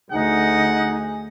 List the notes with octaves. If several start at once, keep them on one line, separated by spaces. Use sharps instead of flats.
D2 D#4 G#4 F#5